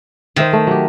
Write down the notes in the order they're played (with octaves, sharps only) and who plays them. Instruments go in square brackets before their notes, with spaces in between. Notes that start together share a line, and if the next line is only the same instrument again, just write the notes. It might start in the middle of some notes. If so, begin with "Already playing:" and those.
[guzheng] D#3 [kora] C5 E5 G5
[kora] A3
F#3 G4